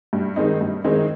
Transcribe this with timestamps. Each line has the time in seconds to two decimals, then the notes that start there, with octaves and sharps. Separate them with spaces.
0.13 G2
0.36 D#3 G#3 C4 D#4
0.61 G2
0.84 D#3 G#3 C4 D#4